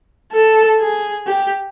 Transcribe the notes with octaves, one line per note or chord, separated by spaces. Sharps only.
A4
G#4
G4